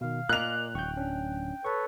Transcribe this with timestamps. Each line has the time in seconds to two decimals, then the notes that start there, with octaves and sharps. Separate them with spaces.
0.01 B2 D#3 F5
0.29 A#2 A#4 D#5 D6 F#6 F7
0.75 D1 G5 C#6 G6
0.97 C#4 D4
1.65 A4 B4 C#5 C#6